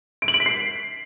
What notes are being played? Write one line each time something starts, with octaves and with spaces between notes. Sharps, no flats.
D7
F#7
D7
B6
C7